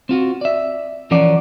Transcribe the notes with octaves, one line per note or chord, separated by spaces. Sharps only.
C4 F4 F#4
D5 E5
E3 F3 C#4 A#4 D5 F#5